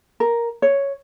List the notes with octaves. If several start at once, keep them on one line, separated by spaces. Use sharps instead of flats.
A#4
C#5